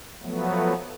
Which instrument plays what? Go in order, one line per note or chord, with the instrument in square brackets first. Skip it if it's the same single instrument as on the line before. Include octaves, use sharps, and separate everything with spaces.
[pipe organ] F3 F#3 A3 B3